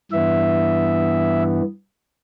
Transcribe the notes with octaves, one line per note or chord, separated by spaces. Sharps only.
G2 E3 B3 E5